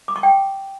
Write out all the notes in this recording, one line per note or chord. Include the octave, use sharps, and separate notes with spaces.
D6
C#6
G5